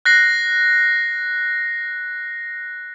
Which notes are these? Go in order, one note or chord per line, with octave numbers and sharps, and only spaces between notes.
F#6 A#6 C7